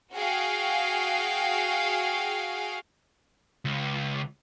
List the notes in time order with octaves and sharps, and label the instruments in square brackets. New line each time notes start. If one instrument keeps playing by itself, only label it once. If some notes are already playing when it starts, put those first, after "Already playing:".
[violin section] F#4 G#4 F5 G5
[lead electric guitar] C#2